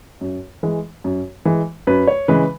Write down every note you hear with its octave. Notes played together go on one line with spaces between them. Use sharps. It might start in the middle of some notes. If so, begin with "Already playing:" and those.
F#2
E3 G#3
F#2
E3 G#3
F#2 B4
C#5
C#3 E3 G#3 B4